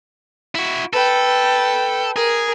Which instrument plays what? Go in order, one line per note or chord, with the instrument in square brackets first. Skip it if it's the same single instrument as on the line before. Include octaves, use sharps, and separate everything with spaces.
[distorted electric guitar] E4 F#4
[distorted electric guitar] A4 [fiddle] B4 G5
[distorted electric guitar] G#4 [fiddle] A#4